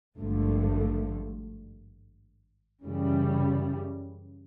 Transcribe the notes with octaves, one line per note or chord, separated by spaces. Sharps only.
G#1 G2 D3 F3 A3
F#2 C#3 E3 G3